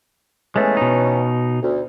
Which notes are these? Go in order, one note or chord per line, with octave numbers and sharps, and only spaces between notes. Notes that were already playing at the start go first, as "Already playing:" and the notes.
E3 G#3 A3 B3 C#4
B2 D#4
D2